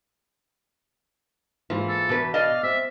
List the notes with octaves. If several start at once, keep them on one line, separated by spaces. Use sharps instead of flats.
G#2 E3 A#3 F4
A4
E2 B2 B4
D5 D#5 F5
C4 E5